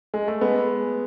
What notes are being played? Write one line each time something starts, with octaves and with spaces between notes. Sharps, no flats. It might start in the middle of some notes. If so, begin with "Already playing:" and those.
G#3
A3
G#3 B3